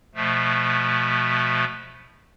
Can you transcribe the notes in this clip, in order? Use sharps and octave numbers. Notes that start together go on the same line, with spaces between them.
B2 F3 A3